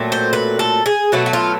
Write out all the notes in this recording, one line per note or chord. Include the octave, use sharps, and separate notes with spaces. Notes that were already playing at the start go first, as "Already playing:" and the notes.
Already playing: A#2 F#3 A3 C4
C5
B4
A4
G#4
B2 F#3 A3 F#4
F#4
F4